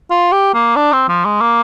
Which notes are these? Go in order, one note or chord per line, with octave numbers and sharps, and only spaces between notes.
F4
G4
A#3
D4
C4
F3
G#3
A#3